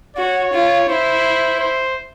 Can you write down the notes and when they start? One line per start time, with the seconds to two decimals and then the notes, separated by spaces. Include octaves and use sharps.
0.16 F#4 C#5
0.52 F4
0.88 E4 C5
1.60 C5